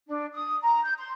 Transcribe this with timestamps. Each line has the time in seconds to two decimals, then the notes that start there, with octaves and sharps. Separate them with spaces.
0.07 D4
0.33 D#6
0.62 A#5
0.85 G6
0.98 C6